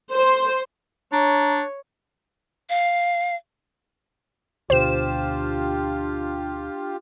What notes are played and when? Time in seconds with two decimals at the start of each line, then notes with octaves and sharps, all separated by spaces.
0.13 C5
1.13 D4 C#5 A#5
2.70 F5
4.70 D2 B2 D4 F4 G4 C5 E7